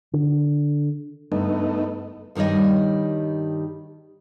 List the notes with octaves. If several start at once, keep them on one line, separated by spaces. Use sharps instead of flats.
D3
F#1 G2 A3 B3 D#4
G2 D#3 G3 C#5 D#5